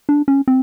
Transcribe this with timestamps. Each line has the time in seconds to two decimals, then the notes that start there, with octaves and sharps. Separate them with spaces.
0.09 D4
0.28 C#4
0.48 C4